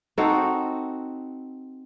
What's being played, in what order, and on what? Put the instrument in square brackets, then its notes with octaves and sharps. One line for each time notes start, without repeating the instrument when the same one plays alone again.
[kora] C4 D#4 F#4 A4